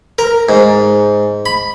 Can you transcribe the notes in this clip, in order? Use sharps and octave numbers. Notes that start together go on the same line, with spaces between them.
A#4
G#2
B5